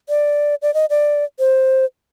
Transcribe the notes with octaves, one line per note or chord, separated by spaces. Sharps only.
D5
D5
D#5
D5
C5